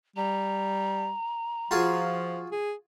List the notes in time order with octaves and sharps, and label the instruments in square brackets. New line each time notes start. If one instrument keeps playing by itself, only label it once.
[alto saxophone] G3 [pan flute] A#5
[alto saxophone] F3 [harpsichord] F4 F#4 G#4
[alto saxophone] G#4